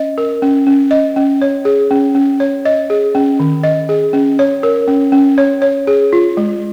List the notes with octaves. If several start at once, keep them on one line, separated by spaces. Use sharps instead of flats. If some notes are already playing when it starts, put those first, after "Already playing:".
Already playing: C#4 D#5
A#4
C#4
C#4
D#5
C#4
C#5
G#4
C#4
C#4
C#5
D#5
G#4
C#4
D#3
D#5
G#4
C#4
C#5
A#4
C#4
C#4
C#5
C#5
G#4
F4
G#3